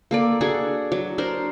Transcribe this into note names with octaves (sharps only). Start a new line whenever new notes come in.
A#3 A4 D5
D4 F#4 G#4 A4
F#3
D4 A#4 C5